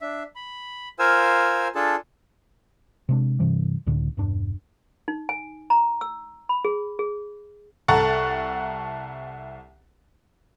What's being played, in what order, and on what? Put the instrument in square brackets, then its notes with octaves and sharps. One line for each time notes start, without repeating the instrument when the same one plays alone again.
[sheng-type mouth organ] D4 E5
B5
F4 A#4 C5 F5 G#5 E6
D4 F4 G#4 A4 A5
[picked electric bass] C3 G#3 D4
G2 C3 E3 G3
C#2 A2 D3
E1 G2 D4
[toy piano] D#4
G#5
A#5
E6
B5
G#4
G#4
[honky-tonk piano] C2 A4 F#5 A#5 C#6 A6